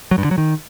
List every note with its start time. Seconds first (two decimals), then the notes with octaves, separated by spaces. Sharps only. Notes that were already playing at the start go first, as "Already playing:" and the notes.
0.11 F#3
0.18 G2
0.24 D3
0.31 F#3
0.38 D#3